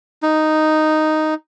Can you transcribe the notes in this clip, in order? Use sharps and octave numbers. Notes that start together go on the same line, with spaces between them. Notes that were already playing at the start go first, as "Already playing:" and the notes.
D#4